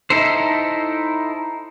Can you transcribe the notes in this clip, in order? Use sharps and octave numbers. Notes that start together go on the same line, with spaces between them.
D#4 E4 A4 C5